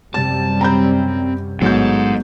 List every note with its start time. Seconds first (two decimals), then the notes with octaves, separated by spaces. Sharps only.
0.14 F#2 C3 G3 A5 A6
0.61 C4 A#5 B5 G6
1.62 A1 G#2 F#3 B3 A4 G6